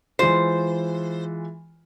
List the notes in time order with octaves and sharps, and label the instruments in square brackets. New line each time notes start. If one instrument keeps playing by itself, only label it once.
[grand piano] E3 G#3 F4 [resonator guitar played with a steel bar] C5